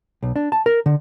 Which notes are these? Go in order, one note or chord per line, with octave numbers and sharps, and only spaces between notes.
B1
D4
A5
A#4
D3